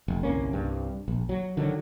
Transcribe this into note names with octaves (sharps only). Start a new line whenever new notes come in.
F1
G1 C2 A#3 C#4
C2 G2
A#1
F#3
D3 D#3 F3 F#3